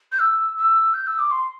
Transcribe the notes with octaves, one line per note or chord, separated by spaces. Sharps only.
G6
E6
E6
G6
E6
D6
C6